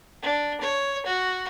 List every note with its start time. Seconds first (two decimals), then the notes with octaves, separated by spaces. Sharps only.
0.22 D4
0.61 C#5
1.06 F#4